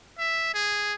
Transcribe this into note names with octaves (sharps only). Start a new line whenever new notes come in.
E5
G#4